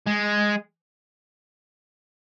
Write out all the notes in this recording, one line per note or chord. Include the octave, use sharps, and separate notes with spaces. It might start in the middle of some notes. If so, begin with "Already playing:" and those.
G#3